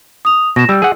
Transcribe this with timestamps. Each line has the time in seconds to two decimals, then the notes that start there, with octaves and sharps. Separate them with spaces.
0.25 D#6 F7
0.56 B2 A#6 E7
0.69 G3 E6
0.82 G#4 F#5